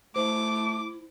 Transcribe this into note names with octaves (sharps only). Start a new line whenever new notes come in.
A3 E4 C5 D6